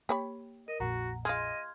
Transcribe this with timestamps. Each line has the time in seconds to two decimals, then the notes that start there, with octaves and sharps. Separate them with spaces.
0.09 A#3 G4 C#5 B5
0.68 A#4 D#5
0.80 A#1 F2 A#2 F#4 F#5 A#5
1.25 G#3 F4 D#5 C6 F6 G#6